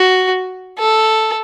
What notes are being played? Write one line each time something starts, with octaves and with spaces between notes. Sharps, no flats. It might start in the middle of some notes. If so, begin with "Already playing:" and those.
Already playing: F#4
A4